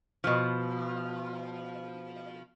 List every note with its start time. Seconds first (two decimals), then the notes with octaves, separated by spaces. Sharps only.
0.24 B2 F3